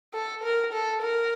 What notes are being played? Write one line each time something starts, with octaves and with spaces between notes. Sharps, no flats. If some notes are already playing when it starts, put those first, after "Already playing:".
A4
A#4
A4
A#4